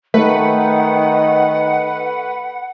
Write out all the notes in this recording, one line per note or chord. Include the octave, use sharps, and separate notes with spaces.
D#3 A3 B4 F#5